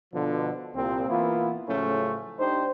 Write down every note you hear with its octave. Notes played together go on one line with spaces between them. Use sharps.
B2 D3 F3
C2 A#2 C4
E3 A#3 B3 E4 F4
A2 C#3 F3 F#3 A3 C#4
D4 D#4 G4 C5